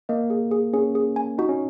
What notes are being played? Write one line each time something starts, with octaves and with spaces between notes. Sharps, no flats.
A#3 D#5
G#4
G#4
C#4 G#4
G#4
G#5
D#4 F#4
C#4